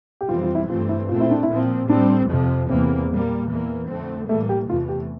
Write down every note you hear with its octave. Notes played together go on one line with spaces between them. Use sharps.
G4
F2 E3 G3 C4 F4
F4
E4
G2 E3 A3 C4 F4
E4
A#2 A3 C4 F4
E4
D4
E4
A#2 F3 C4
A2 G3 C4 D4
F2 C3 F3
E2 C3 E3 A#3 C4
A#2 G3 A#3
E2 E3 A#3
F2 D3 A3 C4
A2 E3 G3 A3 A#3
G4
E2 C3 E3 A3 F4
G4